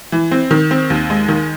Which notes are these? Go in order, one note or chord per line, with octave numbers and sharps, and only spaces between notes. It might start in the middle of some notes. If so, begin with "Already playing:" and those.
E3
C4
D#3
C4
D#2
G#3
D#3